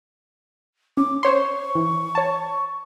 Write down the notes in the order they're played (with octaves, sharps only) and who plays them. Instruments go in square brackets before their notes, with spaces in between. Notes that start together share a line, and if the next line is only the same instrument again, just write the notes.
[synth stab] C#4 [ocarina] D6
[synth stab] C5 C#5 C6 [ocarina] C#6
[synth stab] E3
C#5 A5